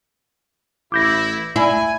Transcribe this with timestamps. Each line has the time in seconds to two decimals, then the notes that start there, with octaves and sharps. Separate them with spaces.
0.92 A1 E4 D6 G6 A#6
1.56 E4 G#5